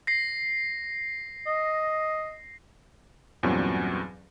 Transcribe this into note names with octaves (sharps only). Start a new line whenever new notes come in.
A#6 C7
D#5
E2 G2 A#2 F#3 C4 C#4